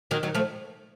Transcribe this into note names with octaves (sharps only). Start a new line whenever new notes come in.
D#3 F#3
D#3 F#3
F3 A3